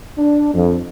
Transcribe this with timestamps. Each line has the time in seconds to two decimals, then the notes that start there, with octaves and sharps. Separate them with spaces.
0.18 D4
0.54 F2